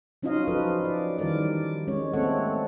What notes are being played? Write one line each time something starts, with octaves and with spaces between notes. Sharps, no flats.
F#3 C#4 D#4 F4 D#5 F5
F3 F#3 F4 A4 B4
D5
D#3 E3 G3 A#4 D5
G#3 C#4 C#5
A3 A#3 C4 A4 C#5 F#5